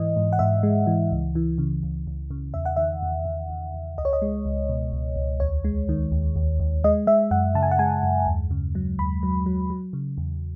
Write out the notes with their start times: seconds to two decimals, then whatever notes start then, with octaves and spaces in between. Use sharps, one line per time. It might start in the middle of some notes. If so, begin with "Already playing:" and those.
Already playing: G#2 E3 D#5
0.16 G#2
0.33 F#5
0.39 G#2 E5
0.63 G#3
0.87 E3
1.12 C#2
1.35 E3
1.58 C#3
1.83 C#2
2.07 C#2
2.31 C#3
2.54 E2 E5
2.65 F#5
2.76 D#3 E5
3.03 E2
3.25 E2
3.50 E2
3.74 E2
3.98 C#2 D#5
4.05 C#5
4.13 D#5
4.22 G#3
4.46 C#2
4.69 B2
4.92 C#2
5.16 C#2
5.40 D#2 C#5
5.64 G#3
5.89 D#3
6.12 D#2
6.36 D#2
6.60 D#2
6.84 G#3 D#5
7.07 G#3 E5
7.31 F#2 F#5
7.55 C#3 A5
7.62 G#5
7.71 F#5
7.79 G#3 G#5
8.03 F#2
8.26 D#2
8.51 C#3
8.75 F#3
8.99 D#2 B5
9.23 F#3
9.46 F#3
9.70 F#3
9.93 C#3
10.18 E2